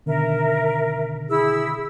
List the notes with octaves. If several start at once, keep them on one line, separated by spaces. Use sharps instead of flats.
B2 D3 D#3 A#4 E5
E4 G#4 E6